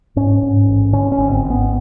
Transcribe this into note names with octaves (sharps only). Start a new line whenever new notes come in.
G#2 C#4
G#2
A1
D3 C#4
C#4
G#1
C4
G#1
B3